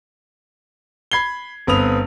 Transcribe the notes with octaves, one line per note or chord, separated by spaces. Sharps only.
B5 G#6 C7 G7
G1 B3 C4 B5 D#6 F7